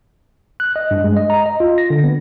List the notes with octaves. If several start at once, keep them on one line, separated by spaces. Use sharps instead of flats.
F#6
D#5
G2
G#3
D#5
A#5
D#5
F4
A#6
D3
B3